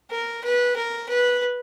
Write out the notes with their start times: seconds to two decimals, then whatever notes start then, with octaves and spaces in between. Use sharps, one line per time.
0.11 A#4
0.44 B4
0.76 A#4
1.09 B4